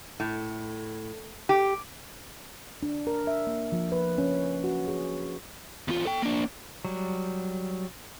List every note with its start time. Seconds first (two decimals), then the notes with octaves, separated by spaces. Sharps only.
0.20 A2
1.49 G4
2.83 D4
3.07 A#4
3.27 E5
3.47 A#3
3.72 F3
3.92 B4
4.18 C#4
4.64 F#4
4.88 G#4
5.88 E2 F4
6.05 A4 G5
6.22 A#3 D4
6.85 F#3 G3